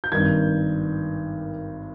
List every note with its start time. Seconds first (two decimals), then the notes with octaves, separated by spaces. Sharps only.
0.04 G6
0.12 G#1 G2 D#3 G#6